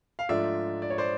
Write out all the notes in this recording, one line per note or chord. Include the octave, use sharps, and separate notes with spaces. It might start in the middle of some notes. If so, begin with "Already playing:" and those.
F5
G#2 F3 A3 D4 F4 D5 E5
D5
C#5
C5 D5